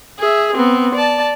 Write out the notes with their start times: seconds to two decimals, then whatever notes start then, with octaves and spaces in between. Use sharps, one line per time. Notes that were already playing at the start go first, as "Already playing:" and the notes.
0.19 G#4 E5
0.55 B3 C4
0.95 D5 A5